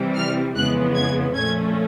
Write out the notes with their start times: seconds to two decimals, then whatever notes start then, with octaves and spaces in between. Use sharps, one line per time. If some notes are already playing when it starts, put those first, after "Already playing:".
Already playing: C3 E3 G3
0.15 F6
0.55 F2 C#3 E3 G#3 B3 F#6
0.95 G#6
1.35 A#2 F3 A3 C#4 G#6